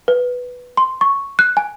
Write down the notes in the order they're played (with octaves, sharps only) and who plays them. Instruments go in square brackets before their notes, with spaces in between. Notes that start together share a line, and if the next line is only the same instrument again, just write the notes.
[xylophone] B4
C6
C#6
F#6
G#5